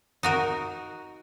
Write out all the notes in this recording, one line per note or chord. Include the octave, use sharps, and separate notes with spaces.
D#4 F#4 A#4